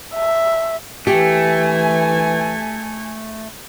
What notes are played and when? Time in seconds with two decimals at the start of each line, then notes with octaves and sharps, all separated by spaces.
0.15 E5
1.07 E3 A3 G4 G#5